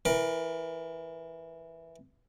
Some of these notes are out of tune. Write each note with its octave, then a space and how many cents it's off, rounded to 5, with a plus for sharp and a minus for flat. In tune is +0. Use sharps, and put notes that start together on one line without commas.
E3 +0 A#4 +20